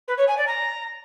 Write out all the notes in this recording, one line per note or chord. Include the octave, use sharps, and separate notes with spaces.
B4
C#5
G#5
D5
A#5